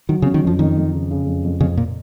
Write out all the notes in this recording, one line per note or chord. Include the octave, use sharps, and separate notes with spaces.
D#3 F#3
C#3
C#4
D#3
F2 F3
F2 D#3
F2
C#3
C#3
F2
F2
F2 C#3
A#2